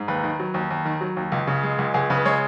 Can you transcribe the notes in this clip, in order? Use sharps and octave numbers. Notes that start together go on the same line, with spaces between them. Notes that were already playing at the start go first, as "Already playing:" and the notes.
Already playing: G#2
D#2 B4
D#3
F#3
D#2
D#2
D#3
F#3
D#2
C#2
C#3
G#3
C#2
C#2 G#4
C#3 B4
G#3 C#5